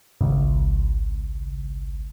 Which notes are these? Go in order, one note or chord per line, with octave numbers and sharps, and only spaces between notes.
G#1 C#2